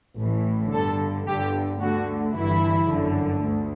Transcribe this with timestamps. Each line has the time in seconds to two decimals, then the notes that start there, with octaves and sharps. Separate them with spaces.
0.18 A1 A2 E3
0.73 G1 G2 D3 A4
1.27 G1 G2 D3 G4
1.81 D2 D3 F#4
2.35 G1 G2 E3 E4
2.89 G1 F#2 D3
3.44 D2